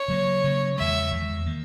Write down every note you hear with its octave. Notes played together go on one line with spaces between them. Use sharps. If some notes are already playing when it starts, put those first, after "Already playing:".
Already playing: C#5
C#3 F#3 A#3
C#3 F#3 A#3
E2 D#3 G#3 E5
E2 D#3 G#3
D#3 A#3